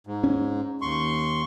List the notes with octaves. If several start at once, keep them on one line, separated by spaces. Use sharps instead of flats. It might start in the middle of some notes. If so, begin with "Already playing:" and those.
G#2
C#4
D#2 C6 C#6